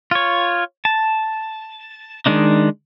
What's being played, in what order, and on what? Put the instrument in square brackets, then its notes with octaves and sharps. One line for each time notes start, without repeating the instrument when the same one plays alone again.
[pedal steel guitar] F4 C#5
A5
D#3 G#3 D4 D#4